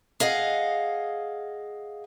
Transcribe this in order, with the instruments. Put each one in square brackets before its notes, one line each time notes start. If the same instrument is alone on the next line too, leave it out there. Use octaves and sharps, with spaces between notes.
[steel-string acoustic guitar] G#4 D#5 F5 F#5